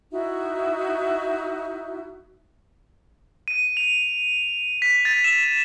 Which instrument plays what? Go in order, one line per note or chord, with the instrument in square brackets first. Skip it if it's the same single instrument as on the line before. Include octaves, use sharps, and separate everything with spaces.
[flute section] D#4 E4 F#4 E5
[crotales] D#7
F7
B6
A6
E7